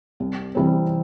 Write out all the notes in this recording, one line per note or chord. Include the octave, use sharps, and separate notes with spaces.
C2
C3 E3 G3 C4